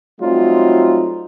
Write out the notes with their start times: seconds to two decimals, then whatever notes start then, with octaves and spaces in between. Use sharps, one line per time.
0.21 F#3 G3 A3 C4 D#4 F4